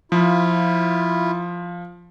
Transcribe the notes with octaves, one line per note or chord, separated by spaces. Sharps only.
F3 E4 F4